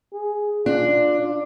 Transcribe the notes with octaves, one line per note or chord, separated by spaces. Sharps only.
G#4
D4 F4